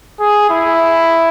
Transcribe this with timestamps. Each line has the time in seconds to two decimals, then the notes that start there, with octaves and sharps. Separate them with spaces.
0.20 G#4
0.50 E4